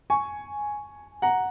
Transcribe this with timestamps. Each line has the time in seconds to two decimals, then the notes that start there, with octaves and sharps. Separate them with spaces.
0.10 G#5 C#6
1.22 F#5 A#5